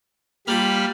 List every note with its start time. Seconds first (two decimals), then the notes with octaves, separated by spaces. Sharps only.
0.47 G3 A#3 F4 B5 F6